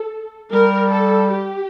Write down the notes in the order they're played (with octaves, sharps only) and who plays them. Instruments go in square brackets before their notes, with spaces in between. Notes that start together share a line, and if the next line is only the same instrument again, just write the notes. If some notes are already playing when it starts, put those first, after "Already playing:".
Already playing: [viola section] A4
[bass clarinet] G3 [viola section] A#4
[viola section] A4
G4